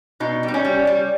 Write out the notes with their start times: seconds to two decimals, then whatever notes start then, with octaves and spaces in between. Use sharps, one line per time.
0.20 B2 D#4
0.43 G3
0.48 D#4
0.54 C#4
0.65 G3
0.87 G3